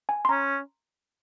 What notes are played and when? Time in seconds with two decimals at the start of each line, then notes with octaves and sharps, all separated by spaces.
0.09 G#5
0.25 C6
0.29 C#4 A#5